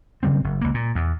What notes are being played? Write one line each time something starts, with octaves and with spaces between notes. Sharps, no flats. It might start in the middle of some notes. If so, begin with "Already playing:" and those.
C#3 F#3 G3 C4
F#1
C#2 A#3
A#2
E2